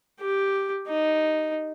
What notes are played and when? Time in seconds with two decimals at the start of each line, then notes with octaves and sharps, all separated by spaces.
0.20 G4
0.87 D#4